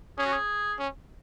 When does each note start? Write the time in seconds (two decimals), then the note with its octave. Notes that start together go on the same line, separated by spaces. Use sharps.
0.18 C#4 G#4
0.25 F#4
0.32 G#4
0.78 C#4